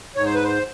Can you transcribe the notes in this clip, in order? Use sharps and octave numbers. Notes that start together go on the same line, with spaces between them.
G#2 C#5
C5
B4
C5